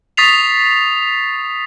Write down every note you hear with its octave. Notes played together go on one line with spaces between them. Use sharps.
C#6 D#6 A6 B6 C7 F7